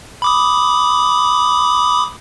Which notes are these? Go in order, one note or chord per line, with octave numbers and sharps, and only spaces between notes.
B5 D6 D#6